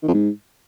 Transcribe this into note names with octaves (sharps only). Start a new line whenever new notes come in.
D#3
F2
G#2